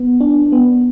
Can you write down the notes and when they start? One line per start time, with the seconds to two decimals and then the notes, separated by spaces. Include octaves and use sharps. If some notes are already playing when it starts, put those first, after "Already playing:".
Already playing: B3
0.21 D4
0.52 B3